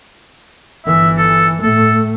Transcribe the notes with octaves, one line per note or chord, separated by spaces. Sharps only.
G1 E3 E5
A4
A2 A3 A4